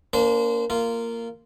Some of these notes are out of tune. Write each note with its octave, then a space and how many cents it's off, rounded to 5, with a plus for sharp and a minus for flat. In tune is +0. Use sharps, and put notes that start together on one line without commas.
A#3 +0 D4 -45 C5 -25
A#3 -15 F4 -15